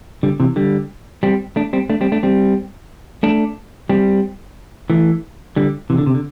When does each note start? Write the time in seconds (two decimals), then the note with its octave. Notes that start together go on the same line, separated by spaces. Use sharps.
0.23 D3 G3
0.40 C3 E3
0.56 D3 G3
1.23 G3 C4
1.56 A3 D4
1.73 G3 C4
1.90 A3 D4
2.01 G3 C4
2.12 A3 D4
2.23 G3 C4
3.23 A3 D4
3.89 G3 C4
4.90 E3 A3
5.56 D3 G3
5.90 C3 E3
5.98 D3
6.06 C3
6.14 D3